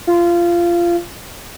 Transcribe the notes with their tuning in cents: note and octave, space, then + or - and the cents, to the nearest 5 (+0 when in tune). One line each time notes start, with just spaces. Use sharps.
F4 -20